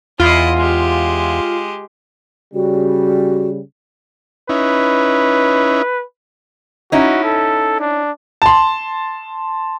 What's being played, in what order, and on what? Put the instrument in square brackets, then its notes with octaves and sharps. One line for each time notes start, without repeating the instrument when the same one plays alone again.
[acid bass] E2 [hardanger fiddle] E4 D#5 [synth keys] F4
[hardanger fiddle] G#3 G4
[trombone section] C#3 G3 [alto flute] F#4
[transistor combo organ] C#4 D#4 E4 [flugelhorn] B4
[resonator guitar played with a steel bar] C#4 D#4 E4 [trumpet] F#4
[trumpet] A4
D4
[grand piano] A5 C6